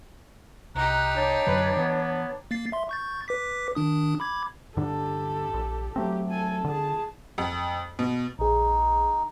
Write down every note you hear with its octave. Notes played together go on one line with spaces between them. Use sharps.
C2 D#4 G4 A#5 F#6
D4 C#5
F#2 D3 F#3 B4
E3 B3
A#3 A6 C7
E5 C6
C#6 G6 A6
B4 D6 B6
D#3 D4 D#6
B5 D6 G#6
G2 D3 D4 G4 A4
A#1
F#3 A3 C4 G4
A4 G#5
D3 G#4 A5
F2
B2
A#1 D#4 G#4